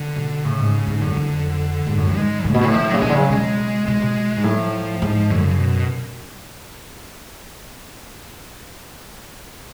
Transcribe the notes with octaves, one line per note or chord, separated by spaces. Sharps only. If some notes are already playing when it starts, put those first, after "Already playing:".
Already playing: D3
B2
A2 C#3
G#2
G#2
F#2 D3
F2
G#2
F#2
G#2
G#3
A2 C#3
B2
A2 D3
F3
F#3
C#3
B2 G#3
D3
C#3 F#3
B2 G#3
B2 G#3
B2
G#2
A2 F#3
F3
G#2
F#2 D3
C#3
B2